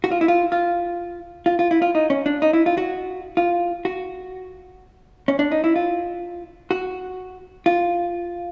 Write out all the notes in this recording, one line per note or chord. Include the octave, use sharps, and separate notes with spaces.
F#4
F4
E4
F4
F4
F4
F4
E4
F4
D#4
C#4
D4
D#4
E4
F4
F#4
F4
F#4
C#4
D4
D#4
E4
F4
F#4
F4